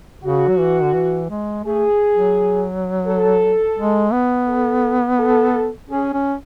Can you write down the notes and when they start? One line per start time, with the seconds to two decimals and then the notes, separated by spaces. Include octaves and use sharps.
0.23 C#3 F#4
0.48 F#3
0.58 E3
0.83 D3
0.94 E3
1.30 G#3
1.64 A3 G#4
2.12 F#3
3.06 A4
3.77 G#3
4.12 B3
4.47 A4
5.18 A4
5.89 C#4 G#4
6.13 C#4